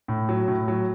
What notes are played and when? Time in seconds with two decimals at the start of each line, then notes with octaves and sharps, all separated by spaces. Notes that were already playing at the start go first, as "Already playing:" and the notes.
0.08 A2
0.29 F#3
0.48 A2
0.68 F#3